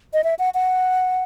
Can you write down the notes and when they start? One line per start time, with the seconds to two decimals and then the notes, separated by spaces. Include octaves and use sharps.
0.13 D#5
0.24 E5
0.39 F#5
0.54 F#5